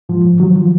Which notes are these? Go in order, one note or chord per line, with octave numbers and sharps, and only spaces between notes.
G#2 F3
G#2
D#3 F#3
F3